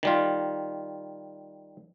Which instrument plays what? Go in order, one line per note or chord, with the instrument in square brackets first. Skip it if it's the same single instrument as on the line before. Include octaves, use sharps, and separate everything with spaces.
[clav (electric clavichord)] D#3 G3 F4